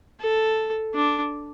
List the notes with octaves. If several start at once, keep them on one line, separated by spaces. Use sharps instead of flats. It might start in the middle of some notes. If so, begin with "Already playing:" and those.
A4
D4